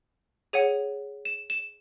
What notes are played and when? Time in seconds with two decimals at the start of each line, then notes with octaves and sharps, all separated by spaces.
0.53 G#4 C#5 F#5 D#7
1.25 E7
1.50 E7